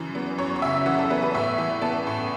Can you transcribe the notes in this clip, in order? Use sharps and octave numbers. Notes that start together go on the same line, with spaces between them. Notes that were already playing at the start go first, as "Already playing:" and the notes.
Already playing: F#2 C#3 E3
B3
F#2 C#5
C#5
C#3 E5
E3 F#5
A4
B3 B4
B4
A2 E5
E3
B3 A5
A2